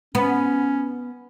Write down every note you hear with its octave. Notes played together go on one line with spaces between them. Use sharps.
B3 C#4